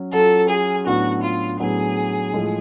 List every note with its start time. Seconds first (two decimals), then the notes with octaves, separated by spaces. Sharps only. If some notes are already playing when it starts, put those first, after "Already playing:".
Already playing: F#3 C#4
0.13 F#3 C#4 F4 A4
0.50 G#4
0.86 A2 F#3 B3 D4 F#4
1.23 F4
1.60 A2 F#3 B3 D4 G#4
2.33 A2 F3 G#3